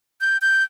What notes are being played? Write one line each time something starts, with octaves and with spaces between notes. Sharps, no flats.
G6
G6